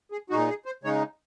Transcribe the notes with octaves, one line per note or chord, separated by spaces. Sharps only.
G#4
A#2 G#3 D#4 F#4
G#4
C5
C#3 G#3 D#4 C#5